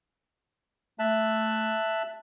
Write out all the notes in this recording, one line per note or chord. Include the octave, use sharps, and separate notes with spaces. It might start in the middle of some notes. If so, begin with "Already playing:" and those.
A3 E5 A5 F#6